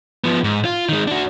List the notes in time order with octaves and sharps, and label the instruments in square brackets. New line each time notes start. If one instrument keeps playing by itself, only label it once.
[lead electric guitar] F3 B3
G#2
F4
D#3 G#3
D4 F#4